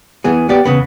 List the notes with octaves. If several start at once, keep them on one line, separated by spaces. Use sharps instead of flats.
E2 E3 B3 G#4
B3 G4 D5
E2 A#2 C#3 B3